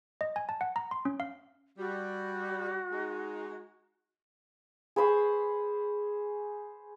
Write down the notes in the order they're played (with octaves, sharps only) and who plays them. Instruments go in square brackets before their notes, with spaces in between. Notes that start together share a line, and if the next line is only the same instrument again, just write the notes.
[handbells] D#5
G#5
A5
F#5
A#5
C6
C#4
F5
[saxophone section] G3 [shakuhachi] F#4
[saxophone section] G#3 D#4
[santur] G#4 C5 B5 C#6